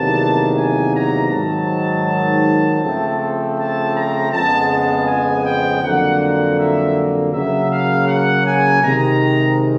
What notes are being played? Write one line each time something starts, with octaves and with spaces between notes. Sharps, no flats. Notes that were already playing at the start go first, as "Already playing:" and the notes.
Already playing: E2 C3 D#3 F#3 A#3 A5
G#5
A#5
G#2 D#3 F#3 A5
C#3 F3 A3 C4
A5
A#5
F2 C#3 F3 G#3 B3 A5
A5
G#5
G5
F2 D3 F#3 A#3 F#5
F#5
E5
C#3 F#3 A#3 E5
F5
F#5
G#5
C3 D#3 G#3 A#5